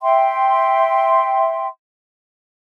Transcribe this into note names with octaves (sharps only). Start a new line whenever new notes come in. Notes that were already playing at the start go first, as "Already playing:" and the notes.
E5 G5 C6